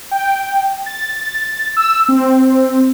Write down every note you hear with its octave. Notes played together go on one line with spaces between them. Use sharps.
G5
A6
E6
C4